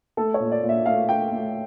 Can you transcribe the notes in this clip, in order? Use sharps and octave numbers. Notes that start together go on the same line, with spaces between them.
A3 A4
C#5
A#2
D5
A#2
E5
A3 F5
A3 G5
A3